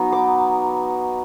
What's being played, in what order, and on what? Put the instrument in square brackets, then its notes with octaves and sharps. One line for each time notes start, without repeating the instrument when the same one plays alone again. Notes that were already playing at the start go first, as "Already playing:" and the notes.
Already playing: [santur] F#3 B3 D#4
D6